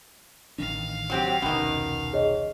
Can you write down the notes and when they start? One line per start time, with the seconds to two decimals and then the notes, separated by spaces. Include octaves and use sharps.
0.58 A1 D#3 D4 F5
1.10 F#3 C4 G4
1.42 E1 C2 B2 D#3 C#4
2.13 G#4 C#5 D#5